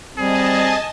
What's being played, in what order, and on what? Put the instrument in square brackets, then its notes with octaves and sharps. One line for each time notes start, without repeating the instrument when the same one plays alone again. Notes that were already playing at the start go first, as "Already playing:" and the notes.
[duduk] G3 [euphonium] C4 [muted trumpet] G#4 [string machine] D#5 G#5 A5